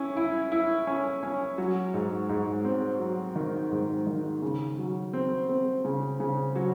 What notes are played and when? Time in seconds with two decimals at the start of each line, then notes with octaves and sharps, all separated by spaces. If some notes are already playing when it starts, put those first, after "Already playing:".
Already playing: C#4 E4
0.17 E4
0.52 E4
0.87 C#4
1.23 C#4
1.58 F#3
1.94 G#2
2.29 G#2
2.65 C4
3.00 F#3
3.36 D#3
3.71 G#2
4.07 D#3
4.42 C#3
4.78 F#3
5.13 C4
5.49 C4
5.85 C#3
6.20 C#3
6.56 F#3